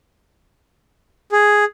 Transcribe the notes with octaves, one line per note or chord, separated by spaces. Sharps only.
G#4